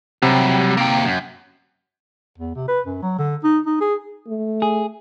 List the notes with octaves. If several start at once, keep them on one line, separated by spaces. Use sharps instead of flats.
C3 F#3 G3
A#3 G5
F#2
E2
C3
B4
F#2
F#3
D3
D#4
D#4
G#4
A3
G#4